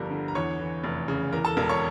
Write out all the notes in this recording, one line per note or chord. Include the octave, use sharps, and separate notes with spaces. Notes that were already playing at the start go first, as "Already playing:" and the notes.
Already playing: G1 F2 G3 A4 A#4 A#5
D3
A#5
E2 C#5 C#6
E3
F1
C#3
E2 A#4 A#5
A4 A5
E1 A#4 A#5
C#5 C#6